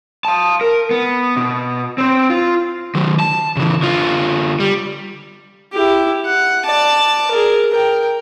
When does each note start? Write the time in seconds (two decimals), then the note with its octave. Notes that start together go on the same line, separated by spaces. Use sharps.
0.25 F5 A5
0.61 A#4
0.91 B3
1.37 B2
1.98 C4 C5
2.30 F4
2.95 D#3 F#3
3.20 A5
3.57 C#3 E3
3.82 D3 F4
4.60 G3
5.73 E4 G4
6.26 F#5
6.65 D5 A5
7.31 G#4 A#4
7.72 A#4 G5